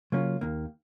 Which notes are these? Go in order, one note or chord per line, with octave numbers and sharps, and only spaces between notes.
C#3 F#3 A#3 C#4 F4
D#2 D#3 A#3